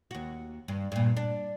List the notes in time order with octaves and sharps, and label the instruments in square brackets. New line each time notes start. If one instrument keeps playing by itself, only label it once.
[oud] D#2 F#4
G2
G2 A#2
D4